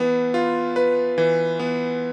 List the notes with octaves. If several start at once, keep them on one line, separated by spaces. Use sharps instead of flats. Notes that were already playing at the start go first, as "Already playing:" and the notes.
Already playing: E3 B3
F4
B4
E3
B3